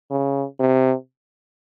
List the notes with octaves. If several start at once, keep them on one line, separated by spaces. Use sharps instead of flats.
C#3
C3